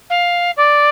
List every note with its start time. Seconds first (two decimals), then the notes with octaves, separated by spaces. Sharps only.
0.10 F5
0.57 D5